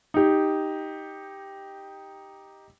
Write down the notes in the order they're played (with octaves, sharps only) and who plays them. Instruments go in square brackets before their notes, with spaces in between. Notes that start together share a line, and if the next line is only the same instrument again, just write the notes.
[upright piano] D#4 G4